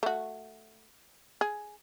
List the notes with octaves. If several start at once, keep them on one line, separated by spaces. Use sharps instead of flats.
A3 F#4
G#4